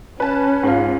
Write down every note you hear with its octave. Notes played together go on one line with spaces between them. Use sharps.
C#4 B4 A5
G#2 F4